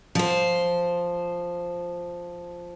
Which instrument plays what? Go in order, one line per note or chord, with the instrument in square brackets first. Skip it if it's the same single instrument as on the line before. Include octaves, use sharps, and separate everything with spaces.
[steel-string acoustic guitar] F3 C5